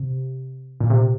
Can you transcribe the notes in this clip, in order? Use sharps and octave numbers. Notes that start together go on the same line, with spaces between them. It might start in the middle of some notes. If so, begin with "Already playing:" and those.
Already playing: C3
A#2
C3